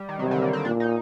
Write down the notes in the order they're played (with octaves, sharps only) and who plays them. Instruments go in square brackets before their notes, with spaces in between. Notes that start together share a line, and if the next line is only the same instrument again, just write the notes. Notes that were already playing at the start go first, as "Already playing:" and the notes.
Already playing: [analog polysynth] G3
D#3
[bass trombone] C3 [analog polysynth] F#3
[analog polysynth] D3
A#3
C4
[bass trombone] A#2 [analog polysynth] D4
[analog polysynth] D#4